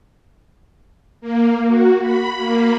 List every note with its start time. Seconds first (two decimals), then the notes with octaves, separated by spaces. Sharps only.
1.21 A#3
1.68 F#4
2.01 B5
2.39 A#3